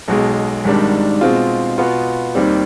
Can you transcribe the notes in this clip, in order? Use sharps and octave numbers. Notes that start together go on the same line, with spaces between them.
B1 B2 G#3
G#1 G#2 D#3 G3 D4
B2 G#3 C4 F4
B2 B3 F4
D#2 D#3 G3 C4